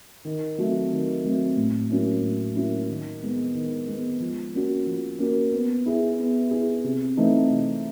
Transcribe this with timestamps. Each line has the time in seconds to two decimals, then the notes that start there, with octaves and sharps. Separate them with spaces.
0.25 D#3
0.58 F#3 A3 C4
0.91 D#3
1.24 F#3 A3 C4
1.57 A2
1.90 F#3 A#3 C#4 E4
2.22 A2
2.56 F#3 A#3 C#4 E4
2.89 D#3
3.22 G#3 B3
3.55 D#3
3.87 G#3 B3
4.20 F3
4.54 A#3 C#4 F#4
4.87 F3
5.19 A#3 C#4 F#4
5.52 B3
5.86 E4 G#4
6.18 B3
6.51 E4 G#4
6.84 C3
7.17 E3 A3 C4 D#4
7.50 C3